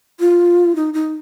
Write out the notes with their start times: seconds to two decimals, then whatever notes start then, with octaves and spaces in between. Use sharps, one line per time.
0.20 F4
0.76 D#4
0.94 D#4